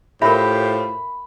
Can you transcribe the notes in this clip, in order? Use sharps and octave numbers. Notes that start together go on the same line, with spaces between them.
A2 F4 G4 A#4 C5 E5 B5